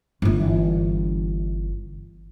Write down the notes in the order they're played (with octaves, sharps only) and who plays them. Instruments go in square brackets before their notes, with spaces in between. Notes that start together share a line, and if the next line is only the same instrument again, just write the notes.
[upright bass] G1 E3